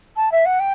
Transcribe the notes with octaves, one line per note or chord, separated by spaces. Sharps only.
A5
E5
F#5
G5